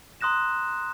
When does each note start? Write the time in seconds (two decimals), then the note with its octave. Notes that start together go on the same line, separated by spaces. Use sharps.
0.21 A#5 C6 D#6 F#6 A#6 E7